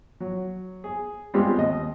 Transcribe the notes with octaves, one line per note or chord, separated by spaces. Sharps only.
F#3
G#4
G3 G#3 B3 C4 F4 G4
D#2 D#5